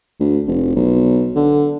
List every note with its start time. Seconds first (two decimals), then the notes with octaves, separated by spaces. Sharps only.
0.20 D2
0.47 F1
0.76 B1
1.36 D3